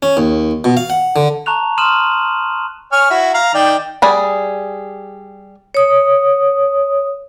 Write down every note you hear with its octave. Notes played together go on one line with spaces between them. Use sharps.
C#4
D#2
B2
F5
F#5
D3
A5 A#5 C#6 F#6 F7
C6 D#6 F6 D#7 E7 F#7
C#5 G#5 F6
E4 F#4
F5 A#5
D#3 D5 G5
G3 G#4 D5
C#5 D#6